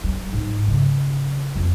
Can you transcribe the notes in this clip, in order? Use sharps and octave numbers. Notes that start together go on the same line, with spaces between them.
G3
G#2
C#3
F2